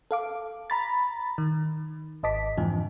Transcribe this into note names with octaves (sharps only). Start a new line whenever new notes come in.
A4 F5 D6
A#5 B5 A6
D#3
G#1 D#5 A5 D6 B6
F2 G#2 D3 E3 F3